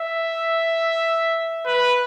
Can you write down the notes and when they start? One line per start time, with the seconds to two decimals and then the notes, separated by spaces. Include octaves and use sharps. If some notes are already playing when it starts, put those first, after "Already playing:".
Already playing: E5
1.66 B4